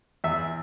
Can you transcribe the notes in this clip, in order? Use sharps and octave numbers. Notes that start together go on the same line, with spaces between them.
E2 E5